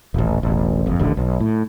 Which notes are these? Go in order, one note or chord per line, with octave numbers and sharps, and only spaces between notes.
D#1 A1
E1 A1
F#1 F2
D#1 A1 D3
B1
A2